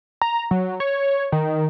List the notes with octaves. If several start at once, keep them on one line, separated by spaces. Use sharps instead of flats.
A#5
F#3
C#5
D#3